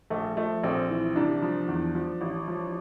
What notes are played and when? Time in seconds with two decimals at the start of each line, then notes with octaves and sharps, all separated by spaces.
0.10 A#1 A3
0.37 F3 A3
0.64 A#1 C4
0.90 E3
1.16 C2 D4
1.42 F3
1.68 E2
1.95 F3
2.21 A1
2.48 F3